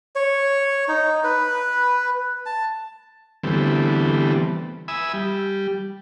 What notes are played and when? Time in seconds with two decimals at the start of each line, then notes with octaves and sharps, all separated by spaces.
0.16 C#5
0.88 D#4
1.24 B4
2.46 A5
3.44 D3 E3 G3 A3 B3 C4
4.88 E5 G#5 B5 D#6 E6
5.14 G3